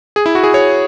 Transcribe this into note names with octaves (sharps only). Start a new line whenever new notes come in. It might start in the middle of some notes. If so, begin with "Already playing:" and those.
G#4
E4
F#4
G#4
C#5